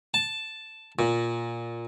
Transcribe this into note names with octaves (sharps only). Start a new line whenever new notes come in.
A5
A#2